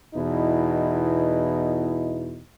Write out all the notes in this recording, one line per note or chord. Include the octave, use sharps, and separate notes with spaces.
E2 B2 D#4 E4